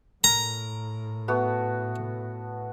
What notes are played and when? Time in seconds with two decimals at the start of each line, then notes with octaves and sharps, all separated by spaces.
0.24 A2 A#4 A#5
1.28 A3 B3 F#4